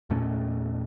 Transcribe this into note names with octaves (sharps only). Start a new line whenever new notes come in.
E2 A#2 A3 C#4